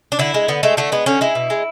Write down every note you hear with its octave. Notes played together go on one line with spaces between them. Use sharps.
D4
D3 E4
G#3
D3 B3
G#3 A3
D3 A3
G#3 B3
D3 C#4
G#3 E4
B2
G#3